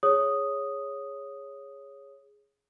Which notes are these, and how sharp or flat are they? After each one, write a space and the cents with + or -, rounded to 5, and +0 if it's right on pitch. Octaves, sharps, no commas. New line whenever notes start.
G#4 +0 C#5 +0 D#6 +0